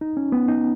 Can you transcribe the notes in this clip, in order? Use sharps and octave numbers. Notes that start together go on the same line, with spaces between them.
D#4
C#4
B3
D#4